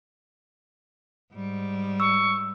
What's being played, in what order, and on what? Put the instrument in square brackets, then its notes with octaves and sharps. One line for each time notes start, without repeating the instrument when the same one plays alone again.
[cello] G#2 G3
[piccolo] C#6 [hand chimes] E6